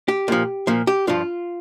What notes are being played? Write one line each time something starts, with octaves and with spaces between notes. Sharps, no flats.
G4
A#2 F3
A#2 F3
G4
G2 F3 F4